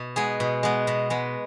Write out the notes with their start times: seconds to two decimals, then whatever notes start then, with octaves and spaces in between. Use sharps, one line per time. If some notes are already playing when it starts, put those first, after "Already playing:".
Already playing: B2
0.16 G#3 B3 G#4
0.40 B2
0.63 G#3 B3
0.87 B2
1.10 G#3 B3